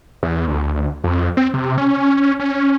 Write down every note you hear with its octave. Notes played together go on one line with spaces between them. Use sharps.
E2
D2
F2
C4
C3
C#4
C#4